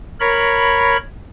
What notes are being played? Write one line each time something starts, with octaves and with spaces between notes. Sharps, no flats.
A#4 C#5 B5